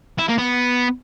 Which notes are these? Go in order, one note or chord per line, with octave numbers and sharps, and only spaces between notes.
E4
A#3
B3